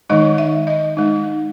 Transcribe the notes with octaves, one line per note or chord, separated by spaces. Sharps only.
D#3 G#3 D#4 D#5
E5
D#5
G#3 D#4